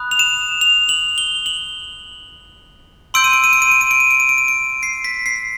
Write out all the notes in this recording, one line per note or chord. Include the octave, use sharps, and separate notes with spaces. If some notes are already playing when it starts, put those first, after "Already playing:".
Already playing: B5 D#6 F#6
F7
E7
F7
F#7
G7
F#7
C6 E6 G6 D7
D#7
D7
D#7
D7
D#7
D7
D#7
D7
D#7
D7
D#7
D7
D#7
D7
C7
B6
C7